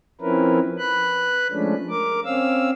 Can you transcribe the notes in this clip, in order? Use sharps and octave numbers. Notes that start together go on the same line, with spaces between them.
F3 C4 C#4 E4 A#4 B4
B4 B5 F#6
F3 G#3 A3 C#4 D4
A#4 D6
C4 C#4 F5 E6